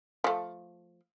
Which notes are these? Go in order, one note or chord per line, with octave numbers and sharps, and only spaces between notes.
F3 A3